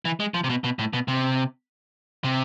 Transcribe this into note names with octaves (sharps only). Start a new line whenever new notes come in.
E3
G#3
F3
C3
B2
B2
A2
B2
C3
C3